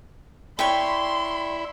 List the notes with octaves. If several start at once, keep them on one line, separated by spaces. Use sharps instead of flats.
E4 C#5 D5 G5 B5 C6